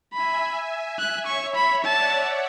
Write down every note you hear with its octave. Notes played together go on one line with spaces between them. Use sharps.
E5 G#5 B5
F#6
C#5 E5 C#6
C#5 E5 B5
D5 F#5 A5
D5 F#5